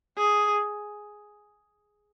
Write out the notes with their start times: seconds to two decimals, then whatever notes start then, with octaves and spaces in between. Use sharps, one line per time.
0.18 G#4